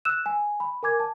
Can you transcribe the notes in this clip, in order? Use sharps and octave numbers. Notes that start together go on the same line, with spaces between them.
E6 F#6 E7
G#5
B5
A#4 G#5 D6 G#6
A5